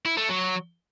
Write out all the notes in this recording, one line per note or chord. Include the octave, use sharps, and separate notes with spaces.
E4
A3
F#3